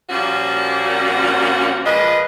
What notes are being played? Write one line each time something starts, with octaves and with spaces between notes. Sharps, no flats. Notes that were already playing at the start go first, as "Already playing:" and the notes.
A#2 F3 G3 A#3 C#4 F#4
A#2 F3 G#3 B4 D#5